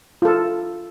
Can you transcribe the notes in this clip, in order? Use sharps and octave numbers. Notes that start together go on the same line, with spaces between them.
F4 A4